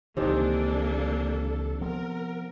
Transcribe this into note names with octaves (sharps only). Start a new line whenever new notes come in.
C#2 C3 D#3 E3 A#3 D4 A4
F3 B3 A#4